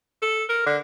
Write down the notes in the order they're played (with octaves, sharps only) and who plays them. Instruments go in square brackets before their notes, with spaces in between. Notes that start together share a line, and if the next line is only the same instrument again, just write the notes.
[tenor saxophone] A4
A#4
D3